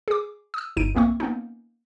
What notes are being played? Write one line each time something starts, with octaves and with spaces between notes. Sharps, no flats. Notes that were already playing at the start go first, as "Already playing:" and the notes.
G#4 D6
D#6 E6
G1 G2 D#4 D7 D#7
B1 A3 A#3 C4 C#6
A#3 B3 C#4 D#4